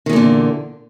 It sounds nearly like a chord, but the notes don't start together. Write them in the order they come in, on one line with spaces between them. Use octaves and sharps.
D#3 E2 A#2 D3